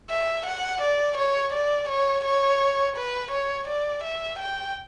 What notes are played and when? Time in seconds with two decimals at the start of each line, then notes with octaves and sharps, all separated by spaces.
0.10 E5
0.46 F#5
0.81 D5
1.17 C#5
1.53 D5
1.88 C#5
2.25 C#5
2.96 B4
3.31 C#5
3.67 D5
4.03 E5
4.39 G5